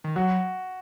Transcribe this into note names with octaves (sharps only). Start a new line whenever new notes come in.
D#3
F#3 F#4